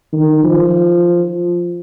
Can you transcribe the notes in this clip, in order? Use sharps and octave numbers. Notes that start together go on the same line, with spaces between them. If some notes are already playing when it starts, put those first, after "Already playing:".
D#3
F3